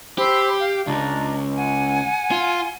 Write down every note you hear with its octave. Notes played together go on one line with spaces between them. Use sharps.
G4 C5 B5 E6
F5
C#2 D4 A#5
F#5 G#5
F4